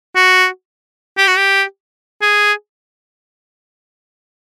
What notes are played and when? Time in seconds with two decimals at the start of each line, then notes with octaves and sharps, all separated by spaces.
0.16 F#4
1.18 G4
1.28 F#4
1.37 G4
2.22 G#4